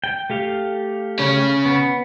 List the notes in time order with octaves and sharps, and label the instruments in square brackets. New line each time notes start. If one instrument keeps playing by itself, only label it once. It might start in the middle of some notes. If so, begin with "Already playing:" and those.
[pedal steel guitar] G5
A3 G4 F5
[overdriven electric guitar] C#3 C#4
[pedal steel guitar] B3